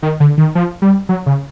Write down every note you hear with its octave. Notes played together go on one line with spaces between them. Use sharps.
D#3
D3
D#3
F3
G3
F#3
C#3